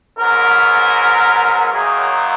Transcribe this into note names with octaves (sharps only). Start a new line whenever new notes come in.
G#2 F#3 B3 A#4
F#2 D#3 F#3 A#3 G#4